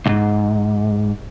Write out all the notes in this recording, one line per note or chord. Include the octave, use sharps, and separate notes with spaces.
C2 G#2